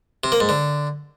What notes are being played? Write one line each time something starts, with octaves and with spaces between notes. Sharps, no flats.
C3
A#3
G#2
D3